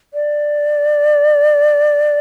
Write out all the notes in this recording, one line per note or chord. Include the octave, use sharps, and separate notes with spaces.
D5